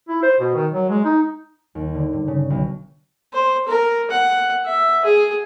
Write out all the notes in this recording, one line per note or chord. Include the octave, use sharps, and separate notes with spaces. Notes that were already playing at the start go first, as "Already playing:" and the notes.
E4
C5
B2
D#3
F#3
G#3
D#4
D#2
D3
G2
C#3
B1
C5
A#4
F#5
E5
G#4